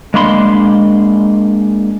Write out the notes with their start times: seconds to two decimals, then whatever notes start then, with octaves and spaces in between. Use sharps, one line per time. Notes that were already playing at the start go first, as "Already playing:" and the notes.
0.14 G#3 A#3 D4 B5 C6